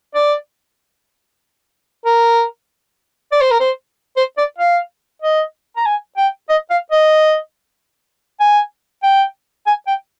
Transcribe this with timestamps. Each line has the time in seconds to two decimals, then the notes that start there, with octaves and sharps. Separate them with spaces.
0.15 D5
2.05 A#4
3.32 D5
3.41 C5
3.51 A#4
3.60 C5
4.16 C5
4.37 D5
4.58 F5
5.22 D#5
5.77 A#5
5.86 G#5
6.17 G5
6.50 D#5
6.70 F5
6.91 D#5
8.40 G#5
9.03 G5
9.66 G#5
9.87 G5